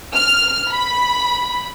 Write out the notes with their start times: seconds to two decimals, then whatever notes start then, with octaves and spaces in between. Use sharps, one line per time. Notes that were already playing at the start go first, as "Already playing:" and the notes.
0.16 F6
0.71 B5